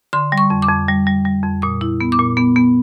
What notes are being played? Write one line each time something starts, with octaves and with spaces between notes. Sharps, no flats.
D3 C6
G3
C#6
F2
D6
F2
G3
G3
G3
F2
A#2 D#6
E4
B3
D6
A#2
B3
B3